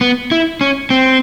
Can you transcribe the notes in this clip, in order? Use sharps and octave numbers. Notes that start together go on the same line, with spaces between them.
B3
E4
C#4
C4